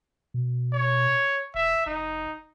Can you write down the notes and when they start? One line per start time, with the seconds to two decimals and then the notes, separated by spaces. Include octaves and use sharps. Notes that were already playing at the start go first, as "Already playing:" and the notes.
0.34 B2
0.73 C#5
1.54 E1 E5
1.86 F1 D#4